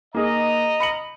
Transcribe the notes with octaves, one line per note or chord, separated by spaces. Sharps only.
A#3 D#4 G#4 D#5 A#5
B5 C#7 F#7